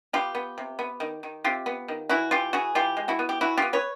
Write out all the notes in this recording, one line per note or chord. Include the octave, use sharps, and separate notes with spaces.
B3 F4 G4
B3
C3
B3
D#3
D#3
C3 F4 G4
B3
D#3
E3 E4 F#4
E3 F4 G4
E3 F#4 G#4
E3 F4 G4
G#3
E4 F#4
B3
G4
E3 E4 F#4
B3 F4 G4
B4 C#5